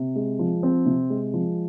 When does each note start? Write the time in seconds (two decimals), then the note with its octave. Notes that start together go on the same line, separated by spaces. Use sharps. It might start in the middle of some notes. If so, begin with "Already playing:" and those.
Already playing: C3
0.16 G#3
0.39 F3
0.63 C4
0.86 C3
1.10 G#3
1.34 F3